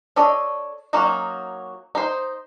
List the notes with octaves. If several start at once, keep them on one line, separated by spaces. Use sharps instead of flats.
D4 A4 C#5 D#5
F#3 A#3 C#4 D#4 F#4
D#4 C5